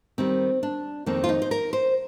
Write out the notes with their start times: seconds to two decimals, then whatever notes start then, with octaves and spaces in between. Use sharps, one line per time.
0.18 D#2 D#3 G3 C4
0.63 D4
1.06 F2 D#3 A#3 C4
1.24 F4
1.29 D#4
1.42 C5
1.51 A#4
1.73 C5